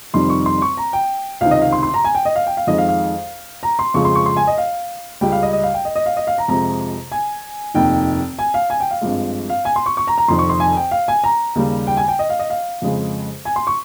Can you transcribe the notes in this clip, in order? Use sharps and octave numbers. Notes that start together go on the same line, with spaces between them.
F1 F2 D#3 G3 C6
C#6
C6
C#6
A#5
G5
C#2 C3 D#3 F5
D#5
F5
C6
C6
A#5
G#5
G5
D#5
F5
G5
F5
F2 D#3 G#3 D#5
F5
F5
A#5
C6
F2 C#3 F3 G#3 C#6
C6
C#6
C6
G#5
D#5
F5
C#2 C#3 G3 G5
F5
D#5
D#5
F5
G5
D#5
D#5
F5
D#5
F5
A#5
F2 C3 F3 G#3 A#5
G#5
F1 D#2 D#3 G5
G#5
F5
G#5
G5
F5
G#1 G2 F3 G#3
F5
G#5
C6
C#6
C#6
A#5
A#5
F1 F2 D#3 C6
C#6
C6
G#5
G5
F5
G#5
A#5
D#2 C#3 G3
G5
G#5
G5
D#5
F5
D#5
F5
F2 C#3 G#3
G#5
C6
C#6